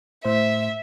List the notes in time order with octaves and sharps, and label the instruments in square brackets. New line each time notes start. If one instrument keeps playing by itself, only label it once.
[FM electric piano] A2 C5 [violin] E5